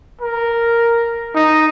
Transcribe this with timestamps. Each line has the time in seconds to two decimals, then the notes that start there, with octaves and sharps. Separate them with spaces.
0.21 A#4
1.35 D#4